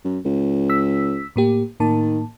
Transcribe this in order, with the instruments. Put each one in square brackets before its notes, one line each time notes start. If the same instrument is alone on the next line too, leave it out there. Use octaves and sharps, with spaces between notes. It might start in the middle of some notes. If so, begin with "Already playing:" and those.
[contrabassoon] F#2
C#2
[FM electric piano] E6 B6
A2 A#3 G4
[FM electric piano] A2 A#3 A5 [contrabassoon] D#3